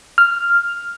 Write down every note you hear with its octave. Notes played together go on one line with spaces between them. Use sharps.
F6